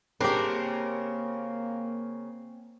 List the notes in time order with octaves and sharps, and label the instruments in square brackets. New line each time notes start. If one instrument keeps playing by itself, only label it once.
[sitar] C#3 A#4 [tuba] A#3 [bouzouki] C4 [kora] D4 G4